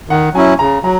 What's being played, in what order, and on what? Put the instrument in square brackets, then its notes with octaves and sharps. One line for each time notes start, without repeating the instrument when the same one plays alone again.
[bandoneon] D#3 [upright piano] F#5
[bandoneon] F#3 C#4 E4 [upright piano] G#5
[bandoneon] C#3 [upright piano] A#5
[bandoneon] F#3 [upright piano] A#5